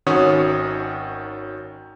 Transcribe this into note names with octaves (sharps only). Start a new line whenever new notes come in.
G#1 D#3 C#4 F#4 C#5 D#6